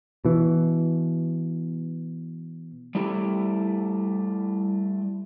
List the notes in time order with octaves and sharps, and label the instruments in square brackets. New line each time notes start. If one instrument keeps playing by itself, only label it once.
[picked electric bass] B2 E3
[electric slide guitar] G3 A3 E4 G4